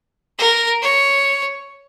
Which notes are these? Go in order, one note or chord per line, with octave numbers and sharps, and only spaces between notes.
A#4
C#5